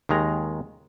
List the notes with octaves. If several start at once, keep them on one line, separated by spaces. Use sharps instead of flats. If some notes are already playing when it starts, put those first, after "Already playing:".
D#2 D#3 G#3 A#5